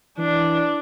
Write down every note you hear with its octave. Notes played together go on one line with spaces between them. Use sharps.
E3 D4